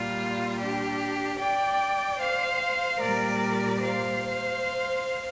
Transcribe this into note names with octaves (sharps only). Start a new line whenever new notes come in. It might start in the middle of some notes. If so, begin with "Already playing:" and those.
Already playing: A#2 G3 F4
D4 G4
D5 G5
C5 F5
A#2 G3 A#4 D5
C5 F5